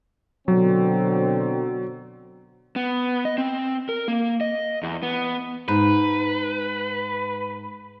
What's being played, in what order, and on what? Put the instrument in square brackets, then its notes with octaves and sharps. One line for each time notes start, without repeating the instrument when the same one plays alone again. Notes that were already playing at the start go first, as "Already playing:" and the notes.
[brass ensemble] B2 D3 C4 [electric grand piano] F#3
[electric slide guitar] B3
D#5
C4
A#4
A#3
D#5
E2
B3
[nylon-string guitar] G#2 [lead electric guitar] B4